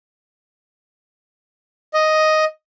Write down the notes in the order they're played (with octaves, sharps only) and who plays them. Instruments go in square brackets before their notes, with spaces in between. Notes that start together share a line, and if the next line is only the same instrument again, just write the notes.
[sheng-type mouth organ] D#5